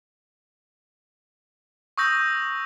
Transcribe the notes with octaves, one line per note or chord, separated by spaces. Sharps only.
C#6 D#6 E6 G6 A#6